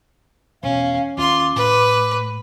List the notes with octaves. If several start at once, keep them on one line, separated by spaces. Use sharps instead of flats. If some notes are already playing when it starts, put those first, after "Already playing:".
E1 B2 C#4 F5
D#2 C#4 F4 C6 D6
A2 B4